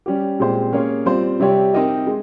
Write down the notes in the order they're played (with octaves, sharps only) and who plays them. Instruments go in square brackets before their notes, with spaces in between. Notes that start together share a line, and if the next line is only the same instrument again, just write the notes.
[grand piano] G3 C#4 G4
A#2 G#3 C4 G4 C5
A#3 C#4 G#4 C#5
G3 C4 F4 C5
C3 G3 C4 G4 C#5
C4 D#4 G4 A#4 D#5
G#3